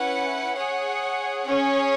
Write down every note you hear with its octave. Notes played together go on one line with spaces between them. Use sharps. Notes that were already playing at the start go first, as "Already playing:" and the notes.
Already playing: C#4 E4 B4 F#5
G#4 C#5 F#5
C#4 G#4 C#5